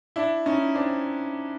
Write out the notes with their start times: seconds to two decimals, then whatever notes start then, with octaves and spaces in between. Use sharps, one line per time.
0.16 D4 E4
0.46 C#4 D#4
0.75 C4 D4